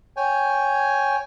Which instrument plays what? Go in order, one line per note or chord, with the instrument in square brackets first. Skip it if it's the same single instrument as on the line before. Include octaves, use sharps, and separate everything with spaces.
[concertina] C#5 G5 G#5